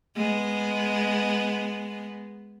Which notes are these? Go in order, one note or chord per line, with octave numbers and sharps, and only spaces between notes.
G#3 B3